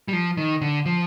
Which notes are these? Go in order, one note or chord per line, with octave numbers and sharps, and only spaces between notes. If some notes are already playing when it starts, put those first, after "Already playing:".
G3
F3
D#3
D3
F3